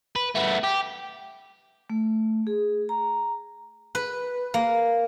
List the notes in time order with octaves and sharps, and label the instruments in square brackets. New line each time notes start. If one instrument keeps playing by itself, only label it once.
[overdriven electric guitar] B4
A3 B3
G4
[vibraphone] A3
G#4
A#5
[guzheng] B4
A#3